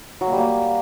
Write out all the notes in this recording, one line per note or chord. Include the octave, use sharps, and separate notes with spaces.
F#3
A#3
G3
A#3